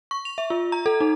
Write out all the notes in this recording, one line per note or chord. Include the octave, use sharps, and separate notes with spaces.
C#6
F7
E5
F4
A#5
A4
D#4